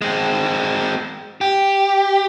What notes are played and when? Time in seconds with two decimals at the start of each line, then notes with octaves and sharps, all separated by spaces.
0.02 G#3 C4
1.41 G4